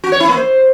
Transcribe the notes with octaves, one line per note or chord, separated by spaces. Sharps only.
F#4
C#5
E4
A#3
C5